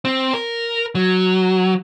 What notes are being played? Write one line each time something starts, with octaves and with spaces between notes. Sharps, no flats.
C4
A#4
F#3